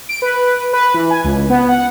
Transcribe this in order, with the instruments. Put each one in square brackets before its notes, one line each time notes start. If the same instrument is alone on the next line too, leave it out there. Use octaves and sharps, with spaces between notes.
[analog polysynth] D7
B4
B4
E3
G#5
C#2
B3
F#5